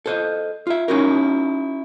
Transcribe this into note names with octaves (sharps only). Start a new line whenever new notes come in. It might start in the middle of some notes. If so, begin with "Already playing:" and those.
A4 C5 D#5
F4 E5
C#4 D#4 E4 F#4 A#4